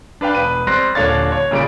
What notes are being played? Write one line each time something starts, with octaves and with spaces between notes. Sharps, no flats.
D4 B4 F5 G5
E1 B4 D#7
G3 C4 C6 F#6 A#6 C7
D#1 D3 D4 C#5 F5 A6
C#5
A#2 C#3 G3 B5 D7